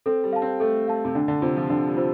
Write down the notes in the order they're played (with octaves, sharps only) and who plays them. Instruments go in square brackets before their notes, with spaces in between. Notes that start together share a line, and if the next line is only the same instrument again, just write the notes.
[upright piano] C4 [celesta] A4
[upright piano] G3
[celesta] F5 A5
[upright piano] C4
[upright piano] A3 [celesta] A4
[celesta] F5 A5
[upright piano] C3
[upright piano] D3 [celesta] D4
[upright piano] D3
[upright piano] C3 [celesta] F4 C5
[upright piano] F3
[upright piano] D3 [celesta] D4
[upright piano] G3
[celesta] F4 C5